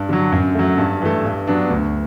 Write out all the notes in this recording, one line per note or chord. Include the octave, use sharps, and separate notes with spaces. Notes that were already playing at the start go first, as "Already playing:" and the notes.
Already playing: G2
D3 F#3
F#2
F#3 A3
G2
E3 A3
G2
F#3 B3 D4
D2